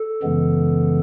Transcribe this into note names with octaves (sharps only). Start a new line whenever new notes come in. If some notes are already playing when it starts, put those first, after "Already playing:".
Already playing: A4
F#2 C#3 E3 G#3 B3